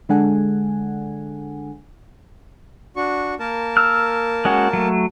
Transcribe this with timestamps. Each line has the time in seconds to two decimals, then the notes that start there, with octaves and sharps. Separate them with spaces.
0.09 D3 G#3 D4 A4 F#5 G#5
2.96 D4 F#4 C#6
3.39 A#3 A#4 A5
3.77 E6 F6
4.45 G#3 C#4 F#4
4.73 F#3 A3